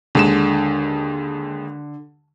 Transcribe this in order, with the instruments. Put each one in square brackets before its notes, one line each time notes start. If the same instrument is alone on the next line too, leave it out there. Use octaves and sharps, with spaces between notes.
[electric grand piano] D#2 G#3 E7 [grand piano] D3